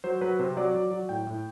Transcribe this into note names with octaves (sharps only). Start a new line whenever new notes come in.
F#3 C5
F#3 B4
C3 C5
F#3 D5
F#3
F#3
A2 G5
A2